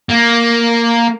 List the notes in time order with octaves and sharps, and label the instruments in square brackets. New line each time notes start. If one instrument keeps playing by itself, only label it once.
[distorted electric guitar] A#3